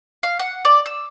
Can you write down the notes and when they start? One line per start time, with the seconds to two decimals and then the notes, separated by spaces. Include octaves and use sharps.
0.23 F5
0.39 F#5
0.65 D5
0.86 E6